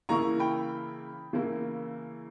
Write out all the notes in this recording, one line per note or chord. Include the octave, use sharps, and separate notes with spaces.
C#3 E3 A#3 E4 A#5 C#6
G5 B5
C#3 E3 A#3 E4